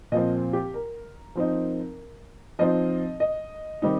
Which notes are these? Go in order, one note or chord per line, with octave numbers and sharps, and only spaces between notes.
A#2 F3 C4 D#5
G4
A#4
F3 C4 D#4
F3 C4 D#4 D#5
D#5
D#3 G3 C4 D#4